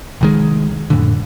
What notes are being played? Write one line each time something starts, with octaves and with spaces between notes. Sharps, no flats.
C2 D#3 G#3
F2 A2 D3